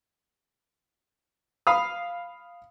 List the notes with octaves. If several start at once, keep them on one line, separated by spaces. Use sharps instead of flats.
F5 B5 D#6